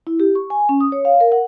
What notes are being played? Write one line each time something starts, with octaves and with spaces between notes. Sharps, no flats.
E4
G4
C#6
G#5
C#4
D#6
C#5
F5
A#4
F#5